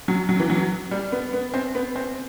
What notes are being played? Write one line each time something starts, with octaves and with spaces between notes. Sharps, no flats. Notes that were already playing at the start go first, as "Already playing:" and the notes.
F#3
F#3
E3
F#3
G3
B3
B3
C4
B3
C4